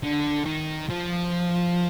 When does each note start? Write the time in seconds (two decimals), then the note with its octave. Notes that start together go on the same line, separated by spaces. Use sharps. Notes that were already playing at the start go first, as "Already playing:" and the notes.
0.03 D3
0.46 D#3
0.90 F3